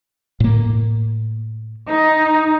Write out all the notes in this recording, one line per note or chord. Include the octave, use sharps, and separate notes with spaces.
A2 A#3
D#4